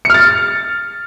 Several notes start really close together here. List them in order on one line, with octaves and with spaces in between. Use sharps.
C#7 F6 A6